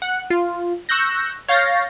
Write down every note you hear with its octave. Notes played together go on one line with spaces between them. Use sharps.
F#5 F#6
F4
C#6 E6 F#6 G6 A#6
C#5 F5 G6 A6 A#6 C7